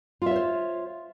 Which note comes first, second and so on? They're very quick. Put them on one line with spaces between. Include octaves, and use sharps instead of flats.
F4 E5 C#5 C5